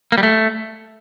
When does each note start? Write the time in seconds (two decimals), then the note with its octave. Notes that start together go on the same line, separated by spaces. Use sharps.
0.12 A#3
0.18 G3
0.23 A3